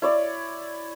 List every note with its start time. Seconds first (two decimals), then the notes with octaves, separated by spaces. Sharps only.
0.02 E4 C#5 D5